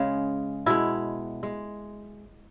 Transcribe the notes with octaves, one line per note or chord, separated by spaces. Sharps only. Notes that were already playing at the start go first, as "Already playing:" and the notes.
Already playing: C#3 G#3
B2 G#3 E4
G#3